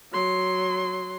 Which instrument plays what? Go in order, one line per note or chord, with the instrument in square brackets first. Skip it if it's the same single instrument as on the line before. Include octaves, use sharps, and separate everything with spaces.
[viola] F#3 C6